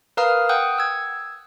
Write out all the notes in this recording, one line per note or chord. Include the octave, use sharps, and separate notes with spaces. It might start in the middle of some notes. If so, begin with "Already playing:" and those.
A#4 B4 F5 A#5 D#6 F6
F#5 G5 D#6 F#6 G6
E6 G#6